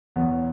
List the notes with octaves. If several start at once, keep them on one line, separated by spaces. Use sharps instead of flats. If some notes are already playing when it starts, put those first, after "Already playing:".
E2 B2 F#3 B3